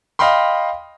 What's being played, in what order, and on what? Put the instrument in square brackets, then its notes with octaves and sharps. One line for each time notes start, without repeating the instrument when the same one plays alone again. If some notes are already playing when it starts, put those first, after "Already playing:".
[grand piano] D#5 F5 G5 B5 C6